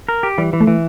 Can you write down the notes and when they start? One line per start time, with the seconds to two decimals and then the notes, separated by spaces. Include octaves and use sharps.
0.08 A#4
0.23 G4
0.38 E3 G3
0.53 E3
0.61 A3
0.67 E3